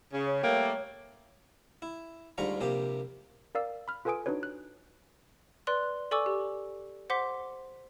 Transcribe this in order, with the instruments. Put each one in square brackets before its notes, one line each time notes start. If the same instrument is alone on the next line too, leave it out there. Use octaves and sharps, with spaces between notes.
[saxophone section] C#3
[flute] C#5
[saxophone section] G3 A3 A#3
[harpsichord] E4
D2 G#2 G3 F4 A#5 C#6
A#1 C3 A#3 G4
[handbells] A#4 D5 F5 E6
B5 F6
F4 A4 B4 G#5 D#6 D7
D4 D#4 F#4 B4 C#5
F#6
[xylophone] B4 D5 C6 F#6 G7
A4 D5 G#5 C#6 D6 E6
G4
C5 F#5 C6 D6 B6